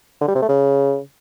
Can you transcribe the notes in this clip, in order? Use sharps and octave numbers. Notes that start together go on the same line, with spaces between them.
D3
G3
C3
A3
C#3